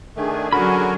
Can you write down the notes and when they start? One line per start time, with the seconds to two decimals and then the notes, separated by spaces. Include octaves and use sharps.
0.17 D#3 A3 D4 G#4 G#5
0.53 D3 F#3 C#4 F#4 A#4 B5